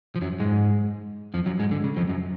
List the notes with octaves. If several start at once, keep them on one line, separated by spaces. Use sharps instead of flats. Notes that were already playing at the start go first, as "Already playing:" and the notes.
F3
F#2 F#3
G#2 G#3
F2 F3
F#2 F#3
G#2 G#3
D3
C#3
F2 F3
F#2 F#3